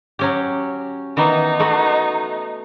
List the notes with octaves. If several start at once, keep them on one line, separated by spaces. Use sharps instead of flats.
F#3 C#4 G4
D#3 E3 B3 D#4
A3 B3 F#4